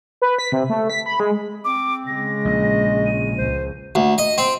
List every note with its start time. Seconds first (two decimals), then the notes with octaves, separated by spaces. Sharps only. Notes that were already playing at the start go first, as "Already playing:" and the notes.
0.22 B4
0.39 B6
0.52 C3
0.70 A3
0.90 B6
1.06 B5
1.20 G#3
1.65 C4 D6
2.07 C#3 G#3 A#6
2.45 A#1 D#5
3.06 D#7
3.38 C#2 C5
3.95 D2
4.18 D#5
4.38 C4